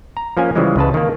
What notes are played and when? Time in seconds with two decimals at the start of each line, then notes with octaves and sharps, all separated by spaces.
0.17 A#5
0.37 F3 A#3 C#4 G#5
0.55 C#3 E3 F3 G3 G#3
0.76 C#2 C#3 B4 A5
0.94 D#3 A#3